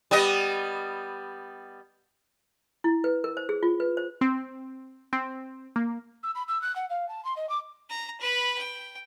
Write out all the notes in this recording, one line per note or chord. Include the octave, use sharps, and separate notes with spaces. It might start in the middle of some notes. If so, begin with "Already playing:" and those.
G3 B3 D#5
E4
B4
A#4
C5
G#4
F4
B4
C5
C4
C4
A#3
E6
B5
E6
F#6
F#5
F5
A5
C6
D#5
D6
A#5
B4 B5
G5